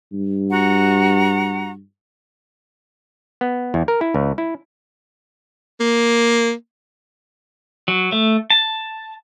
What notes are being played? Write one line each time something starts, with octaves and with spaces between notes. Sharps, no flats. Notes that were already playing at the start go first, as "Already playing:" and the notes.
G2
F#4 F#5 A#5
B3
E2
A#4
E4
C#2
E4
A#3
F#3
A3
A5